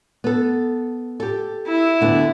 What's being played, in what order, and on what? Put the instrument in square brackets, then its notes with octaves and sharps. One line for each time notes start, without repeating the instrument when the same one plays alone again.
[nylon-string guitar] B3 A4
G4 A4
[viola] E4
[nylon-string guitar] D2 D3 B3